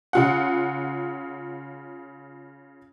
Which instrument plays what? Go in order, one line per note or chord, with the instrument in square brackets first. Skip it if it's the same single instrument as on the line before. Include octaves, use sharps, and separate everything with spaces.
[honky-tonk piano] C#3 F4 F#5